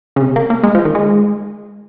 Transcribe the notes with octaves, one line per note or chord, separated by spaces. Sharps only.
C#3
C3
A#3
A#3
G#3
F3
D#3
G#3